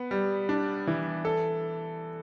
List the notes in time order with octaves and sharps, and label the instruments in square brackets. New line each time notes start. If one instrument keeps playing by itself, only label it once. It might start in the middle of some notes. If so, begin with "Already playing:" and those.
Already playing: [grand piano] B3
G3
D4
E3
A4